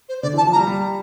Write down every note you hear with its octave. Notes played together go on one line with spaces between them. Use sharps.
C5
D3 D5
E3 A5
F3
A#5
G3
G3